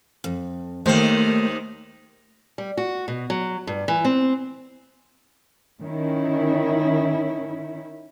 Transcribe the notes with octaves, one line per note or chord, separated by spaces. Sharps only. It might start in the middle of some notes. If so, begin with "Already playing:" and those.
F2
D#2 D#3 A3 A#3 C5
G3
F#4
B2
F#3
G2
E3
C4
D#3 C#4 E4